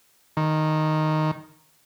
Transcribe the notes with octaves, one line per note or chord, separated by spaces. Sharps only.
D#3